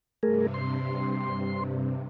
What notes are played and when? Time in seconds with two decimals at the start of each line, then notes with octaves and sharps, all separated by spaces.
0.23 G2 C3 A3 G#4 A#4
0.54 C6